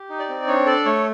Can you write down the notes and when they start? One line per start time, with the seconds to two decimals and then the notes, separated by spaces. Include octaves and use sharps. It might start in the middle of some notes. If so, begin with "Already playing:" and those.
Already playing: G4
0.10 D#4
0.20 D5
0.29 C4
0.47 D4 C#5
0.66 A4 D5
0.86 A3 C#5